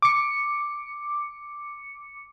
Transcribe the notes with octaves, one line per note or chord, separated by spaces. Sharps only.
D6 C#7